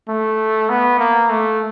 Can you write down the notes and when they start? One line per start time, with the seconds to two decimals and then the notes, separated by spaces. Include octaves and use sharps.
0.09 A3
0.70 B3
0.99 A#3
1.30 A3